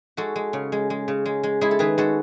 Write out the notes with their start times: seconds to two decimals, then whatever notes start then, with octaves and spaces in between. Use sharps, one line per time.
0.17 G#3 F#4 A4
0.36 G#3
0.53 C#3
0.72 G#3
0.90 G#3
1.08 C#3
1.26 G#3
1.43 G#3
1.61 G#3 E4 G#4
1.71 A4
1.79 D#3 G#4 B4
1.98 G#3 F#4 A4